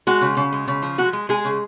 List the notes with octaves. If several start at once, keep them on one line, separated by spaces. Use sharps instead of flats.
G#3 F#4
C#3
C#3
G#3
C#3
F3
G#3 F#4
G#3
G#3 G#4
C#3